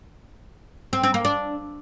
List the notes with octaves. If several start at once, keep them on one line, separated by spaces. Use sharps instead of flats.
C4
C4
A#3
D4